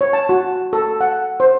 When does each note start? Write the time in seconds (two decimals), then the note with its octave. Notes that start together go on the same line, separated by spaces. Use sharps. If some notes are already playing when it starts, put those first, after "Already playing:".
0.01 C#5
0.13 A5
0.29 F#4
0.73 A4
1.01 F#5
1.40 C5